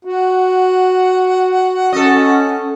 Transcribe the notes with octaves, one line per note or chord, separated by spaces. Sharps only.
F#4 F#5
C#4 A4 D#5